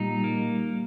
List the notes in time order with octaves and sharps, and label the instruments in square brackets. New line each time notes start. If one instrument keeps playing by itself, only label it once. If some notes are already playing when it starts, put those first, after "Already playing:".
Already playing: [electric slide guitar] A#2 D#4 [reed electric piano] G3
[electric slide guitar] A#3